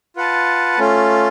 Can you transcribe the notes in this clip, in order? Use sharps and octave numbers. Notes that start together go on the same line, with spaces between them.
F4 B4 F#5 A5
A3 C#4 F4